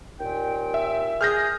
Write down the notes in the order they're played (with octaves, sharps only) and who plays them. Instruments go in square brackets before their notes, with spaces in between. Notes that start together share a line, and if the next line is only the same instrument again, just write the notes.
[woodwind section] D#2 A#2 G5
[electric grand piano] E5
[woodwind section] G#4 [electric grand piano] F6 G6 A#6